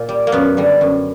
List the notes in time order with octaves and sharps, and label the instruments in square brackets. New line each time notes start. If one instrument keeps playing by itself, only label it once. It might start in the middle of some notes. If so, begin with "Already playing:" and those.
Already playing: [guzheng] A#2
G3
A#3
F#2 B3
D3 G3
F#2